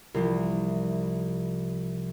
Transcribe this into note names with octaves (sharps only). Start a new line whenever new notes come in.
C2 E3 F3